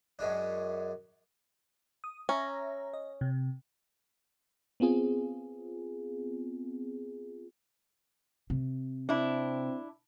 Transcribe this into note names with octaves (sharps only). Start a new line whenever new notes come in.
F#2 G#3 D4
D#6
C#4 E5 A#5
D#5
C3
B3 C4 F4 G#4
C3
C4 D4 E4